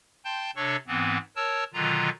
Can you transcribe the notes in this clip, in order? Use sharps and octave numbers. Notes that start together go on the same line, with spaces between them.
G5 A5 C6 G6
C3 D4 A4 C#5 C#6
G#2 E3 B3 C4
A#4 C#5 A5 E6
B2 D3 D#3 F#3 F4 A#5